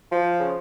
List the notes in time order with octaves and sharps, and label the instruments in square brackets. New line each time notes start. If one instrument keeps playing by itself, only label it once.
[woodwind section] F3
C#3